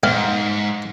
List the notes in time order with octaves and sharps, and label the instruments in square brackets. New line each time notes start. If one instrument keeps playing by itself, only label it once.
[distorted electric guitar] G#2 [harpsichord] F5